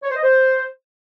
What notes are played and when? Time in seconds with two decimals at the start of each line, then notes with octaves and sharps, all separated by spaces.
0.03 C#5
0.10 C5
0.16 D#5
0.23 C5